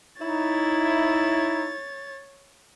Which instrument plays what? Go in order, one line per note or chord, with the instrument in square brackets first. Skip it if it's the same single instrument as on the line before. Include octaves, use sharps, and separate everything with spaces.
[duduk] D#4 [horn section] E4 [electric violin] C#5 A6